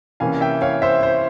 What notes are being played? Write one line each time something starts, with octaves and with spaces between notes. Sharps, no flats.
C3 E3 A#3 C#4 F5 G#5
E5 G5
C#5 F5
C5 E5
C5